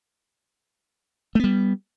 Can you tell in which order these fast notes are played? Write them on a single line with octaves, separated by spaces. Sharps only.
A3 B3 G3